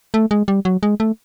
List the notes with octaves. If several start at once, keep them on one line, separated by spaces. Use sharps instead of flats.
A3
G#3
G3
F#3
G#3
A3